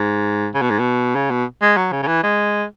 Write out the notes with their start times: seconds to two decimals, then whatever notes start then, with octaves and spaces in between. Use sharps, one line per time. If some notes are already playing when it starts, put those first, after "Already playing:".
Already playing: G#2
0.54 C#3
0.62 B2
0.70 G#2
0.79 B2
1.15 C#3
1.31 B2
1.62 G#3
1.77 F#3
1.92 C#3
2.03 C#3
2.07 E3
2.23 G#3